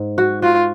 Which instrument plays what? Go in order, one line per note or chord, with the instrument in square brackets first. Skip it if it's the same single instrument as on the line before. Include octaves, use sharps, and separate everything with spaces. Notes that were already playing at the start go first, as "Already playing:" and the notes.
Already playing: [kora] G#2
F#4
[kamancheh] F4 [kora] F#4